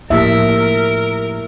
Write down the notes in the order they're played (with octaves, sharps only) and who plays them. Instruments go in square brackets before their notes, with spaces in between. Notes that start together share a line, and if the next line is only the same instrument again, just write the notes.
[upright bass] A2 F3 [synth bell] A#3 E4 G4 [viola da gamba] A#4 [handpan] E5